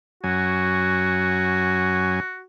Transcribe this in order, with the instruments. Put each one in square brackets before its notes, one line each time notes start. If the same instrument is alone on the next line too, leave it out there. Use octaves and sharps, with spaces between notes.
[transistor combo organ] F#2 F#3 G#5 [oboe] F#4